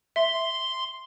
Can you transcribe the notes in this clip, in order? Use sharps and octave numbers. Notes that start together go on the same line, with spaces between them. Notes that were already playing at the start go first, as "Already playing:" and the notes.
E5 C6